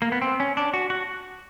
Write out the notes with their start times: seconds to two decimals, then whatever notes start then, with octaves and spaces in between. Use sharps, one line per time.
0.02 A#3
0.12 B3
0.21 C4
0.40 C#4
0.57 D4
0.74 F#4
0.90 F#4